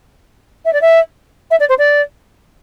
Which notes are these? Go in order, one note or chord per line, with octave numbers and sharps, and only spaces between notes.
E5
D5
E5
E5
D5
C5
D5